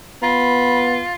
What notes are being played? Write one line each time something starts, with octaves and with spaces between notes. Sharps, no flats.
B3 F4 B5